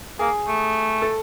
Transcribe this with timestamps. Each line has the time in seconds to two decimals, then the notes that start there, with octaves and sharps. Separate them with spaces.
0.19 A#3 G#4
0.48 A3
1.02 A4